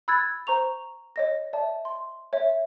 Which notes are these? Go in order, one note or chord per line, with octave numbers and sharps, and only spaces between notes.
B5 E6 F#6 G#6 A6
C5 A#5 C#6 F7
C#5 D#5 A#6
D5 E5 A5
C6
C#5 E5